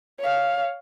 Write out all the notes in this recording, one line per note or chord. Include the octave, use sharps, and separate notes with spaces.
C#5 F5